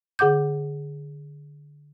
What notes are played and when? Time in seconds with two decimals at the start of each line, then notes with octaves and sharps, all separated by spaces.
0.19 D3 G#4 F#5 D6 G6